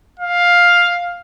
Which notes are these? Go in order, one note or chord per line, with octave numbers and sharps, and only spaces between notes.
F5